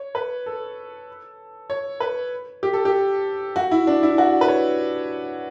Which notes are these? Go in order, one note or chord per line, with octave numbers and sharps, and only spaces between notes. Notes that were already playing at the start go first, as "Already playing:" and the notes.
Already playing: C#5
B4
A4
C#5
B4
G4
A4
G4
F#4
E4
D4
E4
F#4
B4
C#5